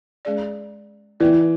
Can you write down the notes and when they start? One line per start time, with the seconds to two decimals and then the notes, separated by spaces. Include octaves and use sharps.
0.25 G#3 C#4 G#4 D5
1.20 E3 B3 E4 B4 D5